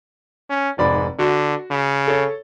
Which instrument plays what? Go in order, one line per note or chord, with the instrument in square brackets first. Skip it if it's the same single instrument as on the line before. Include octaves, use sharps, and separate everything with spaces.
[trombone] C#4
[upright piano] F1 D5 B5 [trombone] G#2
[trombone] D3 [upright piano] F#4
[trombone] C#3
[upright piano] A4 C#5